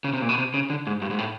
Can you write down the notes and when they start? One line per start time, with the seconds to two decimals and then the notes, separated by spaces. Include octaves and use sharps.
0.04 C#3
0.13 C3
0.22 A#2
0.29 B2
0.38 C3
0.54 C#3
0.70 D3
0.87 G#2
1.02 G2
1.11 G#2
1.19 A2